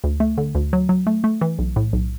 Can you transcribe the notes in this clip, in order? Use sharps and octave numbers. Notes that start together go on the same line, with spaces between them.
D2
A3
D3
D2
F#3
F#3
A3
A3
E3
B1
A2
B1